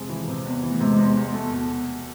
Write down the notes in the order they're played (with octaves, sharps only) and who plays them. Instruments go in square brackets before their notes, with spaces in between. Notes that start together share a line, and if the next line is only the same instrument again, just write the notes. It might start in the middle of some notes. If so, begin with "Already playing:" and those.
Already playing: [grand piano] F2 C3 G#3
E3
C3
E2
E3
[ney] A3
[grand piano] C3 [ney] G#3
[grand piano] E2
E2
A3
B2